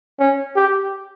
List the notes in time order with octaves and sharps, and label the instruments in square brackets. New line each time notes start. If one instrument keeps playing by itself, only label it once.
[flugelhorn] C#4
G4